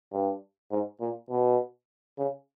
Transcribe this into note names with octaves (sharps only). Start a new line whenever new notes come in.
G2
G#2
A#2
B2
C#3